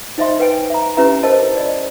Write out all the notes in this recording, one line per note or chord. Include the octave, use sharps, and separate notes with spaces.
D#4 C5 D#5 E5 C6
B4 G5 G#5
E5 A#5
C#4 E4 G4 B4 E5 A#5
A#4 C5 D#5 A5
D5 D#5